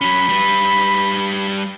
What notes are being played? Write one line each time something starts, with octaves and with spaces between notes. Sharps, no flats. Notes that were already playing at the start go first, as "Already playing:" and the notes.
F#3 C#4 B5
G3 B4